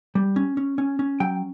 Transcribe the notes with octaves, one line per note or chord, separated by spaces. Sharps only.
G3
C#4
C#4
C#4
C#4
F#3 G5